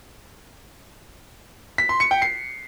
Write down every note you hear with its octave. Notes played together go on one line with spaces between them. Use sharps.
B6
C6
C#7
G5
C7